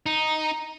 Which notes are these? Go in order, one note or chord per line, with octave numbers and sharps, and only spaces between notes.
D#4